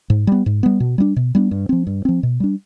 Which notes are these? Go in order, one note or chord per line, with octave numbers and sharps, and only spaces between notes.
G#2
G3 B3
G#2
G3 B3
B2
G3 B3 D4
B2
G3 B3 D4
G2
F3 C4
G2
F3 C4
B2
G3 D4